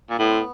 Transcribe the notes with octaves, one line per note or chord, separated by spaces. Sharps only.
A#2
A2 B3
C4
B3